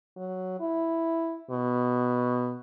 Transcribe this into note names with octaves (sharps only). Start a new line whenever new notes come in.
F#3
E4
B2